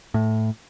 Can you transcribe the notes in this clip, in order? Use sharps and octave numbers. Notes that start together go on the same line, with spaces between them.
A2